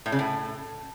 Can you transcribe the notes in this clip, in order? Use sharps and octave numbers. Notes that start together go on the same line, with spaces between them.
A2
C#3
A2